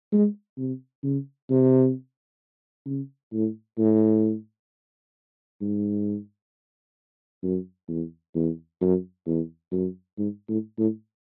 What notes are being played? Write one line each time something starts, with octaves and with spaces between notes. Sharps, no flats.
G#3
C3
C#3
C3
C#3
A2
A2
G#2
F#2
E2
E2
F#2
E2
F#2
G#2
A2
A2